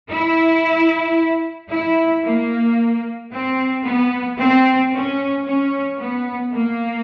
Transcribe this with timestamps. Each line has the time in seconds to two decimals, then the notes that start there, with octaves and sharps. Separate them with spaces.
0.11 E4
1.71 E4
2.24 A#3
3.32 C4
3.85 B3
4.39 C4
4.92 C#4
5.46 C#4
5.99 B3
6.53 A#3